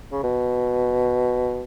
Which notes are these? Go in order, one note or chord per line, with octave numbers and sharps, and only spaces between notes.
C#3
B2